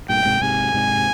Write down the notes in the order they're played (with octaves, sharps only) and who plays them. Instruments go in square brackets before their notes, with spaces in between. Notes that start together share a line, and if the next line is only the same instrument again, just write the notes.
[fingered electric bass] G2 A#2 [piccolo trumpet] G5
[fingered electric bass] G#2 C3
[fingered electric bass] G#2 C3 [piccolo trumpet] G#5
[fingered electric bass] G#2 C3